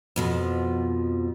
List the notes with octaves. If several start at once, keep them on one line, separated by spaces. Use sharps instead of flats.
F2 B2 F3